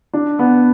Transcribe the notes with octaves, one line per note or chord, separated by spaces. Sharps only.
D4
B3